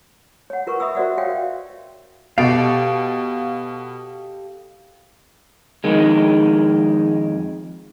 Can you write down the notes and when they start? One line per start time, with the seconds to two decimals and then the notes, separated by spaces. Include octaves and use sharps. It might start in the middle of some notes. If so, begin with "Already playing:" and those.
0.50 C#5 F#5
0.67 F4 A#4 B4 C#6
0.80 E5 B5 D#6 E6
0.95 F#4 A#4 C5 D5 E5 F#5
1.17 F#4 C#5 E5 F5 G5
2.38 B2 G4 A4 F5 D7
5.84 F2 D#3 G#3